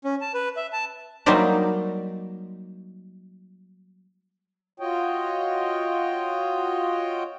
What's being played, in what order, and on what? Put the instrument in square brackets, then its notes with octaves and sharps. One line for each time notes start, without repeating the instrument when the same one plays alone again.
[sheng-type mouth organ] C#4
A5
B4
E5
A5
[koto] F#3 G3 A#3 D#4 C5 D5
[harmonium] F4 F#4 C#5 D#5 G5